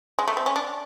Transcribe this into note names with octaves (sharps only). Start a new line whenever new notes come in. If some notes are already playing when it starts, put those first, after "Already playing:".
G#3
A3
C4
C#4
D4